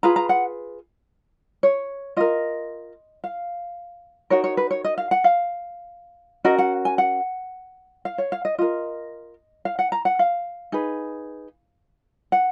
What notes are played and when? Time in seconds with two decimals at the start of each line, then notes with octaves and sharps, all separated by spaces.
0.03 F4 G#4 B4 A#5
0.16 A#5
0.29 F#5
1.63 C#5
2.16 F4 A#4 D#5
3.24 F5
4.30 D#4 F#4 A#4 C#5
4.44 C#5
4.57 B4
4.71 C#5
4.84 D#5
4.98 F5
5.11 F#5
5.24 F5
6.44 C#4 F#4 A#4 D#5
6.58 F#5
6.85 G#5
6.98 F#5
8.05 F5
8.18 C#5
8.32 F5
8.45 D#5
8.58 F4 A#4 D#5
9.65 F5
9.79 F#5
9.92 A#5
10.05 F#5
10.19 F5
10.72 D#4 G#4 B4
12.32 F#5